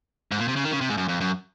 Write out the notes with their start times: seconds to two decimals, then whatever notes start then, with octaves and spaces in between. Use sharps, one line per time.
0.32 G#2
0.39 A#2
0.48 C3
0.56 C#3
0.64 D#3
0.72 C#3
0.81 C3
0.90 G#2
0.97 F#2
1.08 F2
1.21 F#2